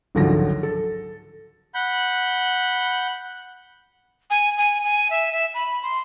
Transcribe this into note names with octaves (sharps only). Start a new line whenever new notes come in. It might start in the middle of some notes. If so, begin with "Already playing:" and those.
G#1 C#2 D3 F3 F#3 A#6
A4
F#5 B5 G6
G#5
G#5
G#5
E5
E5
B5
C6